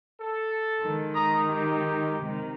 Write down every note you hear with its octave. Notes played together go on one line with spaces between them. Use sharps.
A4
D#3 G#3
A#5 D#6
D#4 G4
C3 D#3